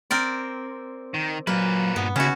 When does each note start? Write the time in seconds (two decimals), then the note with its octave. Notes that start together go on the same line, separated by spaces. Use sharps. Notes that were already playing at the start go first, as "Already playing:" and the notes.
0.11 C4 A#4 D5
1.14 D#3
1.47 A#2 F#3 A#3 B4
1.96 G2 B3
2.16 D#2 C#3 C#4 E4 F#4